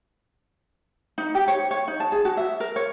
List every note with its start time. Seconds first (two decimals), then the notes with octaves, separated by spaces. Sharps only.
1.18 D#4
1.35 G4
1.48 C#5
1.71 C#5
1.88 D#4
2.00 A5
2.12 G#4
2.25 F#4
2.37 E5
2.60 A#4
2.76 C#5